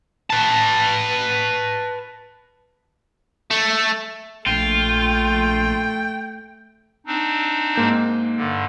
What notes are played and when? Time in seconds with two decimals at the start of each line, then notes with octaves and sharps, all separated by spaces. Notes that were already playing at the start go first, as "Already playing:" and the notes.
0.30 B4 A5
3.50 A3
4.47 A#1 A3 F4 G5
7.06 C4 D4 D#4
7.76 G#2 A#3 G6
8.37 G2 D3